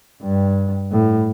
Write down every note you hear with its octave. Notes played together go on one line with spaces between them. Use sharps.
G2
A2